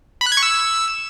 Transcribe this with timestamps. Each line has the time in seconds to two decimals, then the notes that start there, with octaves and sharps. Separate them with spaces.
0.21 B5
0.26 F#6
0.32 G#6
0.37 C#6
0.43 E6